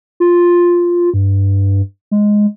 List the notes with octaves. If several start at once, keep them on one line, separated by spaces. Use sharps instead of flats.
F4
G2
G#3